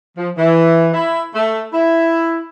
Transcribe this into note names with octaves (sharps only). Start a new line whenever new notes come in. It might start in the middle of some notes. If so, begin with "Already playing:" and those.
F3
E3
E4
A3
E4